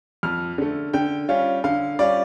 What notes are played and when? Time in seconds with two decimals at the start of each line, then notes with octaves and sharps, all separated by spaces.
0.23 F2 F6
0.58 D3 A3
0.93 D3 G5
1.29 G3 C#4 F4
1.64 D3 F5
1.99 G3 C#4 F4 D5